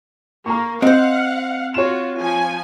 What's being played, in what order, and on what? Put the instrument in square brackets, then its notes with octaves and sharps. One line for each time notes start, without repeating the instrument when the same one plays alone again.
[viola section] A#3 [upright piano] A#5 C#6
[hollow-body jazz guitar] C4 C5 [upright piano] D#5 [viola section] F5 F#5
[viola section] F4 F#4 [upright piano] C#5 E7
[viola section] F3 G#5